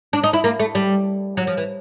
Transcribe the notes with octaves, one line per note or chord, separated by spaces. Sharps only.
D4
D#4
E4
A#3
A3
G3
F#3
F3
E3